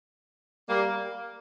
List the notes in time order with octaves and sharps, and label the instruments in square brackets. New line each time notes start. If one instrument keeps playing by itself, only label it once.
[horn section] G3 A#3